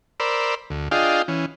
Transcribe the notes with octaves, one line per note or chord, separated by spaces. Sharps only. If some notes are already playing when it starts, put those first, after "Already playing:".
A#4 C5 D5 B5 E6
D2
D4 F4 G#4 D#5 F5 G5
E3 C#4